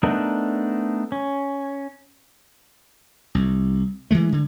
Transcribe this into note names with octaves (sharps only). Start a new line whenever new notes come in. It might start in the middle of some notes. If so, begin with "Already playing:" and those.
A3 B3 D4 D#4 A#4
C#4
C2
E3 F3 G#3 A3
D3